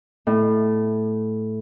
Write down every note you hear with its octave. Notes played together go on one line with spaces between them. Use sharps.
A2